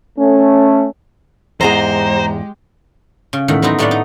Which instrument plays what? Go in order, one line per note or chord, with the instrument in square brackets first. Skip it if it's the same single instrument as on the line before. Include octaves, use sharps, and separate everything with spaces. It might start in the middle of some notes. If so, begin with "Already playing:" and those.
[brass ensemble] A3 C#4
[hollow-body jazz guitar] E2 G#2 G#4 [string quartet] G#3 G4 [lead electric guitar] C5 [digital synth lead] A#5
[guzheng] C#3
E2 A2 D#3 F#5
F#3 B3 C4 D#4
A2 A3 B3 D5 F5 F#5
D#4